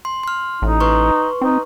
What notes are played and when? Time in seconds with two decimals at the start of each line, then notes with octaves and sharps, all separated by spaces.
0.05 C6
0.23 C6 F6
0.62 A1 D#4
0.80 B4 C6 C#6
1.41 C4 D#4